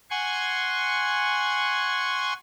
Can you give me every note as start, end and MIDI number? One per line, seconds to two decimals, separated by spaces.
0.10 2.33 78
0.10 2.33 80
0.10 2.33 84
0.10 2.33 85